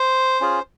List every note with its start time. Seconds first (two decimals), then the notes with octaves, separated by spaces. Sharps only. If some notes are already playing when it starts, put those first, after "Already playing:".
Already playing: C5
0.41 C#4 F4 G#4